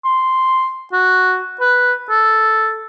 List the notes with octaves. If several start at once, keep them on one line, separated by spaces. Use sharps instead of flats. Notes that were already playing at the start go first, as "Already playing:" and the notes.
C6
F#4
B4
A4